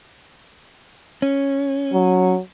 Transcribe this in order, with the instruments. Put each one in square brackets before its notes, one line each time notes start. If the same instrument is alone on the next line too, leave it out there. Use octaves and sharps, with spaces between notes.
[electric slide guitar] C#4
[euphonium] F#3